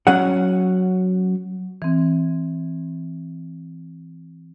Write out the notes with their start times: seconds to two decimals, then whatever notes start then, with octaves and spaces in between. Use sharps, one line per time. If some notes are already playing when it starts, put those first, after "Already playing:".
0.07 F#3 C#4 F#5
1.82 E3 C4